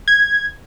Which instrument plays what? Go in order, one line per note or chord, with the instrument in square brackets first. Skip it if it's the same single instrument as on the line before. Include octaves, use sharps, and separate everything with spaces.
[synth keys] G#6